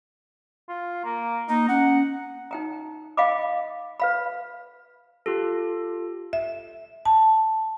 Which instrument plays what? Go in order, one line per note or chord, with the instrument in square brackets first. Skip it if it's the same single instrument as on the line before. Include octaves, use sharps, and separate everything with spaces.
[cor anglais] F4
A#3
[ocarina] A#3 [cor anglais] D#4
[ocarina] C#4 [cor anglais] F#5
[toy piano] D#4 G5 A#5
D#5 F5 G5 G#5 B5 D6
B4 F5 B5
[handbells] F4 G4 A4
[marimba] E5
A5